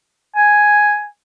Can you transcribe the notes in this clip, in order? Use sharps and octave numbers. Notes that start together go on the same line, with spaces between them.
G#5